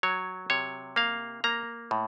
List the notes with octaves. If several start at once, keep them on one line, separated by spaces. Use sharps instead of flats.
F#3 C#5
C3 C#5
A#3 F5
A#3 A#5
A2